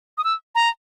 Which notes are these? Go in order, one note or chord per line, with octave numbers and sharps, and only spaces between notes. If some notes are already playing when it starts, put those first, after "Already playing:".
D#6
E6
A#5